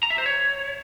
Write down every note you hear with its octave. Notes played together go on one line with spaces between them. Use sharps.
A#5
E5
C5
C#5